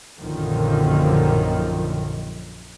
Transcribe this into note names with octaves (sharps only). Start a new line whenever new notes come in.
A#1 F#2 A#2 D3 D#3 F3